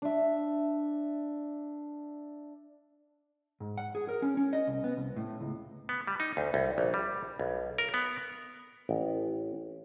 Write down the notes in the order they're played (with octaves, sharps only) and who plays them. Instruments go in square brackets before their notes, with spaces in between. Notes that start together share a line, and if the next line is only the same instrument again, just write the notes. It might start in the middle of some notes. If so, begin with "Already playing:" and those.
[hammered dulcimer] D4 E5
[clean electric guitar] G#2
F#5
G#4
A#4
C#4
C#4
D#5
C2
B3
C2
A2
C#2
[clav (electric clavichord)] B3
G3
D#4
D2
C2
A#1
G3
B1
A#4
B3
A1